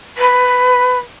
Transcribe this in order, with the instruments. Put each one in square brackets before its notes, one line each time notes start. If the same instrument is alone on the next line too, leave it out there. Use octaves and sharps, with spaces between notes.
[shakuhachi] B4